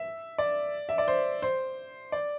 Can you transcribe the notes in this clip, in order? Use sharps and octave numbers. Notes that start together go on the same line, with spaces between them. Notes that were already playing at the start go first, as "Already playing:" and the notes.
Already playing: E5
D5
E5
D5
C5
C5
D5